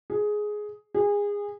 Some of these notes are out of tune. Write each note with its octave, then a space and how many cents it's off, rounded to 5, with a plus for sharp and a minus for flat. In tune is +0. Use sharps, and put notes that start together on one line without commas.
G#4 +10
G#4 -25